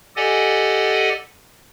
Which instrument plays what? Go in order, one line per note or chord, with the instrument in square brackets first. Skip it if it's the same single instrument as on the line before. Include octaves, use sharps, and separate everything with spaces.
[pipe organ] G4 A4 D5 D#5 F#5 G#5